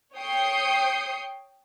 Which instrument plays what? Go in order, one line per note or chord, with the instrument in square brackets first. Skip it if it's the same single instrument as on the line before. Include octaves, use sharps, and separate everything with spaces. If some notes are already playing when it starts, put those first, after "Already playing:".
[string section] C#5 G5 D#6 G6 C7 C#7